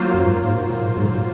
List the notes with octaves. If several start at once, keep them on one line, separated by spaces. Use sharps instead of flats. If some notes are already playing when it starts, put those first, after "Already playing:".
Already playing: F#3 A#3 F4 C5
F#2
G#2
F#2
G#2
A#2
G#2
A#2
G#2
A#2
G#2
A#2